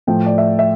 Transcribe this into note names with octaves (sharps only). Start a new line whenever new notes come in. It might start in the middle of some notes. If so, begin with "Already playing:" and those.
A2 F3 A3 G5
D5
E5
E5